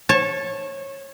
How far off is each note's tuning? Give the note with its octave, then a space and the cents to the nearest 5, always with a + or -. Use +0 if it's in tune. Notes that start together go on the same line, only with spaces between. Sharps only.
C#5 -20 A5 +0